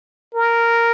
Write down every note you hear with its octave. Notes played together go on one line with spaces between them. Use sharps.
A#4